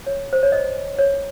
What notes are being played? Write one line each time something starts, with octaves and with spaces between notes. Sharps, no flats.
C#5
C5
C#5
D#5
C#5